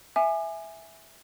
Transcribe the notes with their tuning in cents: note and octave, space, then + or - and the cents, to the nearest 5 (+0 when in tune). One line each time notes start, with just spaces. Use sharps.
E5 +0 G#5 +0 D6 +40